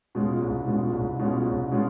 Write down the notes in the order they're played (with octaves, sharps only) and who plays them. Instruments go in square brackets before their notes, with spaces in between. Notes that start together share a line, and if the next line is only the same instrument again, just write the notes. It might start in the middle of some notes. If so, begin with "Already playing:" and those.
[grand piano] B2 G#3 C#4 F4
C2
B2 G#3 C#4 F4
C2
B2 G#3 C#4 F4
C2
B2 G#3 C#4 F4